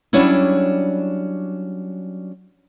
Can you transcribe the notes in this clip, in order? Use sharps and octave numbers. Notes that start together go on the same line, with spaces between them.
F#3 G3 C#4 D4 E4